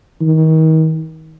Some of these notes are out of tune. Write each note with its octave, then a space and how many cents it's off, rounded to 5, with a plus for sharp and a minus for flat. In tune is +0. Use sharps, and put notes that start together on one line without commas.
D#3 +35